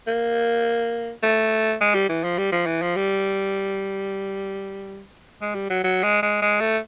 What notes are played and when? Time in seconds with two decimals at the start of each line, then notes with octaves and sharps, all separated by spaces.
0.07 A#3
1.23 A3
1.81 G#3
1.94 G3
2.09 E3
2.24 F3
2.38 G3
2.52 F3
2.66 E3
2.82 F3
2.96 G3
5.41 G#3
5.54 G3
5.69 F#3
5.84 F#3
6.03 G#3
6.22 G#3
6.42 G#3
6.60 A3